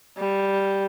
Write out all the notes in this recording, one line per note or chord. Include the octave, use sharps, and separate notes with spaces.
G3